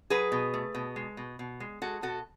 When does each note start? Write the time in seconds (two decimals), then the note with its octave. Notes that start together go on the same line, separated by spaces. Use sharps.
0.10 F#3 G#4 B4
0.32 B2
0.54 A3
0.75 B2
0.96 G#3
1.17 B2
1.39 B2
1.60 G#3
1.82 G#3 F#4 A4
2.02 B2 F#4 A4